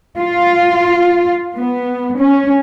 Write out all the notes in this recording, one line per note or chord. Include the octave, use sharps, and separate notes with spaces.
F4
B3
C#4